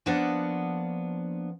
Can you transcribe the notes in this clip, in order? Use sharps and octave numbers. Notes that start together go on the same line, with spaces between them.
F3 A#3 B3 D4 F#5